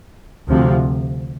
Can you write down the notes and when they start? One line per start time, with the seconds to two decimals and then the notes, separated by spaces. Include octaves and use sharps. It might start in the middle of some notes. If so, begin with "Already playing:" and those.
0.48 D2 C3 F3